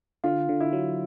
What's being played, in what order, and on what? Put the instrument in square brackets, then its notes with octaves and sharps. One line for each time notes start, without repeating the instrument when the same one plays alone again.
[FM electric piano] D3 [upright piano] F4
[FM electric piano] D3
[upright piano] E4
[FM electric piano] F#3